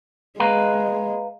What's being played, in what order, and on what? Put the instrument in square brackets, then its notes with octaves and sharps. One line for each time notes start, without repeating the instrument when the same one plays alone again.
[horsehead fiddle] G#3 [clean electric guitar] B4 F5 A#5